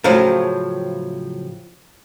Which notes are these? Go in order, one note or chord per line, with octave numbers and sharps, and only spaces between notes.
A2 C#3 F3 F#3